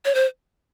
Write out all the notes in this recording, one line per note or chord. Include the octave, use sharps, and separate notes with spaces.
C#5
C5